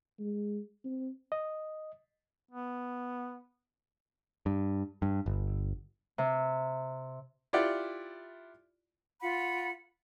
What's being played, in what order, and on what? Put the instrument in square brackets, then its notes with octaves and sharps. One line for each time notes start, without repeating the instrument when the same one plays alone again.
[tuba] G#3
C4
[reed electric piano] D#5
[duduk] B3
[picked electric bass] G2
G2
G1
[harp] C3
[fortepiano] E4 F4 G4 D5 F#5
[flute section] F4 F#5 B5